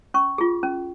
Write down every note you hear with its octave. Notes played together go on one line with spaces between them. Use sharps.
C#4 C#6
F4 G#4
C#4